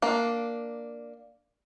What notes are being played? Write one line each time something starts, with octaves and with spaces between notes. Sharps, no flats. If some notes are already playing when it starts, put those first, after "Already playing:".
A#3 D4